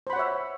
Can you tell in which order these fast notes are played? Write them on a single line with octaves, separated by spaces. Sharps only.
C5 B5 F#5 C#5 E5